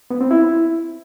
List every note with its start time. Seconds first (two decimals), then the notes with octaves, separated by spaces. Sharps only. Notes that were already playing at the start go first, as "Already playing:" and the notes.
0.11 B3
0.21 C4
0.31 E4